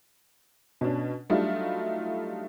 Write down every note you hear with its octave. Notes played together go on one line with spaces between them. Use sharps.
B2 C#4 D4
F#3 G3 A3 D4 D#4 F4